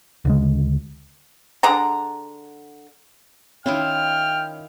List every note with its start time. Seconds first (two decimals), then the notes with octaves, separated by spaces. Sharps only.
0.25 D2 C#3 G#3
1.63 D3 G#4 A#5
3.66 D#3 C#4 E4 F4 G5 F6